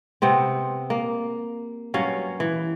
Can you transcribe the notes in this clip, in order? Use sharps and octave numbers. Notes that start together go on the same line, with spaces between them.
C3 B3 C4
A#3
G2 F#3 C#4 F5
E3